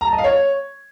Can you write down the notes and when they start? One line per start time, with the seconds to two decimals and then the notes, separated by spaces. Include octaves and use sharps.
0.01 A#5
0.07 A5
0.12 D#5
0.18 F5
0.24 C#5